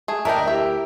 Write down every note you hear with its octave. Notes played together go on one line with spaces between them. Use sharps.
A3 G#4
D2 A#3 D4 G4 A#4 D#5 E5
E4 G4 E5